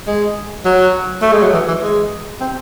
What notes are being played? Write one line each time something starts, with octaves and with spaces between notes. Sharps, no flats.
G#3
F#3
A3
G#3
F#3
E3
E3
G#3
C4